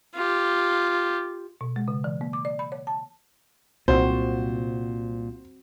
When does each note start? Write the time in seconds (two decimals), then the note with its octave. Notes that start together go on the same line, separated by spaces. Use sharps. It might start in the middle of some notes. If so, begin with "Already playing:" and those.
0.15 F4 G4
1.61 B2
1.76 G#3
1.88 C#3
2.04 E3
2.21 A#3
2.33 D6
2.45 D5
2.59 B5
2.72 C#5
2.87 A5
3.88 C2 A#2 C4 F#4 C5